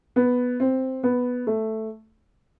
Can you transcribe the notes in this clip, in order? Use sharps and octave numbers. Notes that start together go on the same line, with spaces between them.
B3
C4
B3
A3